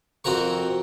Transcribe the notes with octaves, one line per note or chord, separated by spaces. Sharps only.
F2 C4 F#4 A#4 C#6